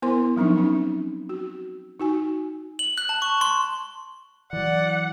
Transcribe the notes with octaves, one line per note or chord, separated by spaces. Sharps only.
B3 E4 A#4 C5 C6
F3 F#3 C4 D4 D#4
C#4 D#4
F#4
D#4 F#4 G#5
F#7
F#6
A5
C#6
C6
E3 F#3 D5 F#5